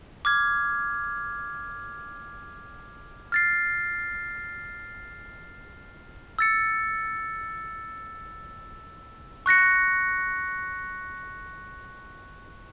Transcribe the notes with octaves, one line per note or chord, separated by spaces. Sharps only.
D6 F6 G#6
F6 A6 C7
E6 A6 C#7
C#6 F#6 A#6 C#7